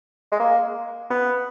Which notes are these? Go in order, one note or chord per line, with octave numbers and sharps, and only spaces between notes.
G#3
A#3
B3